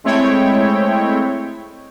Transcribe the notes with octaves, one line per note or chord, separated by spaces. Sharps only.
G#3 A3 C4 E4 C#5 G5